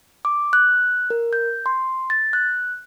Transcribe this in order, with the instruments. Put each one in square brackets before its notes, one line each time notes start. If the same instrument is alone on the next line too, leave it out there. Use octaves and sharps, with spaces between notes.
[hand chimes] D6
F#6
A#4
G6
C6
A6
F#6